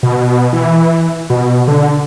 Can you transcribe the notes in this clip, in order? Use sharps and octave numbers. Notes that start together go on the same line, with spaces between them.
B2
E3
B2
D3